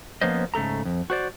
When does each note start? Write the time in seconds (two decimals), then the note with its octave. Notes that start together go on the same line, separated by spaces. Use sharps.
0.21 F3 A#3 B3 C#4 C5 D#5
0.54 G#2 C#3 A3 A4 A#5
0.85 F2
1.10 F#4 C5 D5